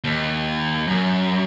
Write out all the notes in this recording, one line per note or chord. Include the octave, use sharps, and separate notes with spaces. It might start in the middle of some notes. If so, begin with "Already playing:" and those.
D#2
F#2